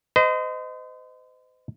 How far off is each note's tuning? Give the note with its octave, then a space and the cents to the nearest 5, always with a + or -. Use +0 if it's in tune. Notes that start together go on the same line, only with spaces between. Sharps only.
C5 -40 D#5 +0